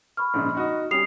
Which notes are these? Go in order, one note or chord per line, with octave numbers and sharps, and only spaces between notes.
B5 C#6 F6
A#1 G#2 C#3
D#4 F#4 D#5
G3 C#4 D#6 C7 F7